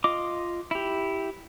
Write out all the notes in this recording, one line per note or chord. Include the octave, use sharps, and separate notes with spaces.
F4 D#5 D6
E4 G4